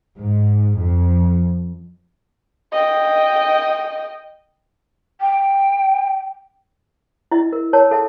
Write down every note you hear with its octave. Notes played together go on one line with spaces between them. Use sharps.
G#2
F2
D#5 G5
G5
E4 D#5 E5
A#4
A#4 C#5 A5
A4 E5 A5